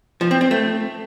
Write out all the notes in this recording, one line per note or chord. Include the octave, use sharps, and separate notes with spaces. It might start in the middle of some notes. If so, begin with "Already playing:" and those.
F3
C4
C4
A3